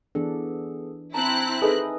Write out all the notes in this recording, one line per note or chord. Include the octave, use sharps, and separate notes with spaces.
E3 B3 D4 G#4 A4
C4 E4 A5 A#5 F#6
D#4 G#4 A4 B4 D#5 E5 D#6